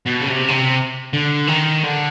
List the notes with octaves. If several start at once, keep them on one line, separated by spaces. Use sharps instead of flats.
B2
C#3
C3
C#3
C3
D3
D#3
D3